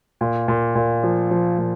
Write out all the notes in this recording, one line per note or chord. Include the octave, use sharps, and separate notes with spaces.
A#2
A#2
A#2
F3
F3
A#2